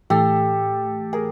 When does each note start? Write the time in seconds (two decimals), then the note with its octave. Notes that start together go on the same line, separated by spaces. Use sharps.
0.10 A2 E3 A3 G4 A4
1.13 G#4 A#4